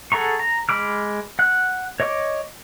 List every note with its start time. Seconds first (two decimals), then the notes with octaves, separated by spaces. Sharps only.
0.12 G#4 A4 F#5 A#5 C#6
0.39 A#5
0.69 G#3 B5 D6 F6
1.39 F#5 F#6
2.00 C#5 D#5 C#6 D6